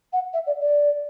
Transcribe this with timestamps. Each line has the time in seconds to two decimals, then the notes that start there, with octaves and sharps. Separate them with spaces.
0.13 F#5
0.33 E5
0.46 D5
0.61 D5